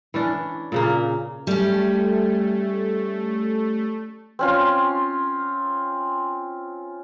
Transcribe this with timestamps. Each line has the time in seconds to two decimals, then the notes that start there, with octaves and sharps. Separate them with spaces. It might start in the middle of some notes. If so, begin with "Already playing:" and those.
0.14 E3 C#4 D4
0.72 A#2 C#3 A#3
1.47 G3 A3 C#4
4.39 C4 C#4 F4